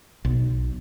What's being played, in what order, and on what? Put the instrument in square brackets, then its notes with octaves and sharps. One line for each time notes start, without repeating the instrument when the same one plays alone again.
[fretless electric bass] B1